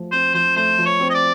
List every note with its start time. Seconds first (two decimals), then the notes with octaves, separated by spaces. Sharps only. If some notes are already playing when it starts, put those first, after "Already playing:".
Already playing: F3 A3
0.12 C4 C5
0.34 F3 C5
0.56 A3 C5
0.78 F3
0.86 C#5
1.00 C4
1.10 D#5
1.14 D5